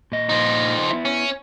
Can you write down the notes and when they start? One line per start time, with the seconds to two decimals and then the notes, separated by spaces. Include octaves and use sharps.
0.12 A#2 D#5
0.29 F3 D#4
0.90 B3 E4
1.05 C#4